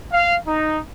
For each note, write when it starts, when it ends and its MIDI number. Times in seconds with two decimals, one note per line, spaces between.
0.12 0.35 77
0.47 0.78 63